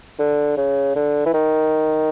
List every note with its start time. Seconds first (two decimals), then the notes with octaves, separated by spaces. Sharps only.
0.19 D3
0.57 C#3
0.96 D3
1.26 E3
1.34 D#3